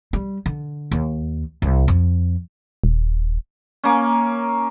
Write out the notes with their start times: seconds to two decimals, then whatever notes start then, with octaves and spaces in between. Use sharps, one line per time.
0.13 G3
0.46 D3
0.91 D#2
1.62 C2
1.88 F2
2.84 D#1
3.84 A#3 C#4